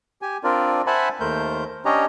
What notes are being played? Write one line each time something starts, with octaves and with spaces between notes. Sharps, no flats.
G4 G#5
C4 D4 F4 A#4 D5
C5 E5 F#5 G#5 A5 B5
D#2 A3 A#4 C5 G6
C#4 D4 G4 C#5 D#5 A#5